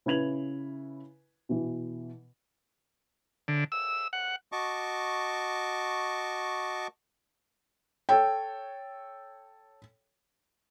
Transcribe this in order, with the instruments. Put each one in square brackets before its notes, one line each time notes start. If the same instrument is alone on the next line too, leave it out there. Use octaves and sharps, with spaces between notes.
[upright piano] C#3 E4 B4 G#6 F7 F#7
B2 E3
[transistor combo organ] D3
E6
F#5
[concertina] F#4 D#5 A5 C#6 D6
[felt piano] A4 C#5 G5